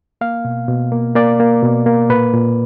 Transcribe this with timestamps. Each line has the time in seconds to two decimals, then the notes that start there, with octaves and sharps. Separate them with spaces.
0.21 A#3 F5
0.45 B2
0.68 B2
0.92 A#3
1.15 A#3 D5
1.40 A#3
1.63 B2
1.86 A#3
2.09 A#2 B4
2.33 A#2